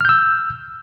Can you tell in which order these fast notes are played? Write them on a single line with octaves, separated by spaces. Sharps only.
F6 G6 E6